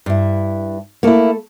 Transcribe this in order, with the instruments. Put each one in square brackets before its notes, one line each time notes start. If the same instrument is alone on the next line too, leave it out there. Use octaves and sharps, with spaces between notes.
[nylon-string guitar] G2 E4
[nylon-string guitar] A3 A4 [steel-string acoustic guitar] A#3 E4